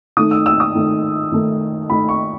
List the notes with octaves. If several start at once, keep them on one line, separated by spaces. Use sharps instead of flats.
D#3 A3 D#4 D#6
E6
E6
D#6
D#3 A3 D#4
D#3 A3 D#4
D#3 A3 D#4 B5
C#6